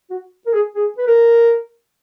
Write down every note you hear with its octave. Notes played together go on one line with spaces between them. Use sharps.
F#4
A#4
G#4
G#4
B4
A#4